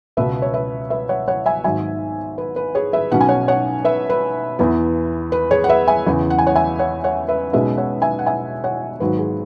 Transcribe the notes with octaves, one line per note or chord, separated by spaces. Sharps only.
C#2 B2 B3 B4 E5
C#5
B4 E5
B4 E5
C#5 F#5
C#5 F#5
E5 G#5
G#1 G#2 F#3 E5 G#5
B4
B4
G#4 C#5
B4 E5
B1 B2 F#3 C#4 F#5
G#5
C#5 F#5
C#5 F#5
B4 E5
B4
E2 E3 B3
B4
G#4 C#5
F#5
B4 E5
E5 G#5
E2 C#3 E3
F#5
G#5
C#5 F#5
E5 G#5
C#5 F#5
C#5 F#5
B4 E5
B1 B2 G#3 C#4 B4 E5
C#5 F#5
E5 G#5
F#5
E5 G#5
C#5 F#5
G#1 G#2 F#3 B4
G#4